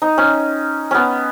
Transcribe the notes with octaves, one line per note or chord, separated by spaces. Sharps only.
D#4
C#4
B3 C#4